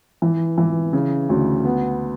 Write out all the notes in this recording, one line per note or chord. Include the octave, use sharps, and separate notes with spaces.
E3
E3
C#3
D2
B3